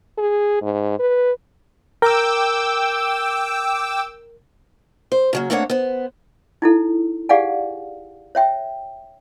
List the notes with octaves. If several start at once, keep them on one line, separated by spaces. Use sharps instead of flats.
G#4
G#2
B4
A#4 G5 D6 E6
C5
C#3 F#3 A#3
A3 A#3 C4 D4 C#5 F#5
B3 C5
D#4 E4 A4
G4 G#4 D5 F5 F#5 G#5
C#5 E5 G5